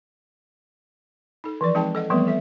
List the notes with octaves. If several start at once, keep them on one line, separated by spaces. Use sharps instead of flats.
D#4 A4
E3 F3 D5
G#3 C4 D#4 G#4 G5 A5
A4 D#5 F#5
E3 F3 G3 A3 B3 C4
A4 E5